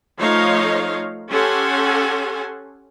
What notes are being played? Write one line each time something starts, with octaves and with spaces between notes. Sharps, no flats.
F3 A3 D#4 C#5 D#5 F5
C#4 G4 A4 F#5 G#5 C6